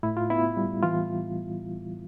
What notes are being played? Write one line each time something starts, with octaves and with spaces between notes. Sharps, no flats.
A2 E4
F4
B3 E4
G3
E3 F4